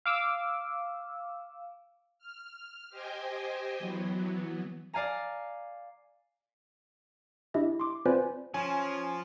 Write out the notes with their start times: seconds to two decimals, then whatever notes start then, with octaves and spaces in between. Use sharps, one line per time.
0.06 F5 D6 E6
2.19 F6
2.90 G4 C5 D#5 G5 G#5
3.79 E3 F#3 B3
4.94 D5 F5 G#5 A#5
7.54 D4 E4 G4 D#5 E5
7.80 C6 D6
8.05 C4 F4 B4 C5 D5 G#5
8.54 F3 C#4 G#5